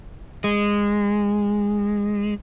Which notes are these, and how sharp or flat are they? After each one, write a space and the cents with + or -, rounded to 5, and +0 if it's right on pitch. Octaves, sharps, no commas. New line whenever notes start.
G#3 -15